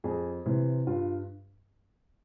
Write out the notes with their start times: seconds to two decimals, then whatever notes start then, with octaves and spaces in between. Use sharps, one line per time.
0.04 F2 G#4
0.45 C3 E3
0.87 G2 F4